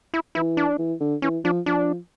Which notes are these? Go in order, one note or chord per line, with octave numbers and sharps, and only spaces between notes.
E4
E3 E4
D4
E3
D3
E3 C#4
F3 D4
F3 D4